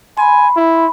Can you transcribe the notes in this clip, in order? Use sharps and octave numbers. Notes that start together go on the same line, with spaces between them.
G#5 B5 C6
E4